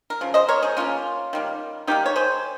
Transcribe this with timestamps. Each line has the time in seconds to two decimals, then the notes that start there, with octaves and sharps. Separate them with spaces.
0.10 A#4
0.21 C#3 F3
0.34 C5 D#5
0.48 A#4 C#5
0.63 G#4 C5
0.77 C#3 F3 A#3 C#4 F4
1.33 D#3 G3 A#3
1.87 D#3 G3 A#3 D#4 G4
2.06 C#5
2.16 G#4 C5